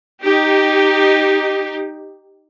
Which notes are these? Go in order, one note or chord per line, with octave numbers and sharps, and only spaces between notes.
D#4 G4